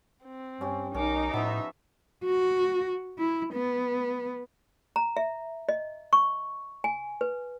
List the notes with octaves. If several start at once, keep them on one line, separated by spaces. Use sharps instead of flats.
C4
G2 C#4 G4
B1 C#4 D#4 A#4 D6
A2 F3 B3 E5
F#4
E4
B3
A#5
E5
D#5
C#6
G#5
B4